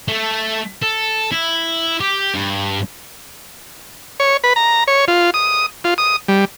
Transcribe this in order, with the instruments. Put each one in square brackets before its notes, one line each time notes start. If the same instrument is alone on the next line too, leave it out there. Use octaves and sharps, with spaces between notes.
[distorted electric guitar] A3 A4
A4
E4
G4
G2
[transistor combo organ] C#5
B4
A#5
C#5
F4
D#6
F4
D#6
G3